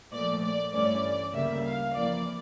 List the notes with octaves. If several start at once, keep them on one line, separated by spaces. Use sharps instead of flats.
A#2 F3 A3 D5
D5
G2 E3 A3 C#4 D5
D2 C#3 G3 A#3 E5
F5
F2 E3 A#3 D5